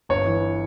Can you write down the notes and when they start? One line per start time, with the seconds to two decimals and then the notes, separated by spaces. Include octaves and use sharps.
0.09 G1 C#5
0.26 E3